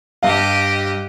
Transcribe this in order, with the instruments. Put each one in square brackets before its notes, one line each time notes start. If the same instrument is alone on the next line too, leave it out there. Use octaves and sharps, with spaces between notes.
[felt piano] G2 F5 [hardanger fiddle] G4 D#5